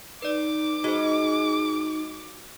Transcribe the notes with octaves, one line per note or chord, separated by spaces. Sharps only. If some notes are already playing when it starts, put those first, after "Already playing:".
D#4 B4 D5 D6
G#3 F#4 C5